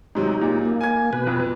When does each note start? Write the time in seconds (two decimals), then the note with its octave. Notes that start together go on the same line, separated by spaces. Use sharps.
0.15 G#2 C3 F#3 D#4
0.41 A#2
0.65 A#3
0.81 G#5 G#6
1.13 B2 B4
1.27 F2